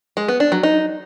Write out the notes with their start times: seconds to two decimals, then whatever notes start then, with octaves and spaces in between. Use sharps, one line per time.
0.17 G#3
0.28 B3
0.40 D4
0.52 F#3
0.63 D#4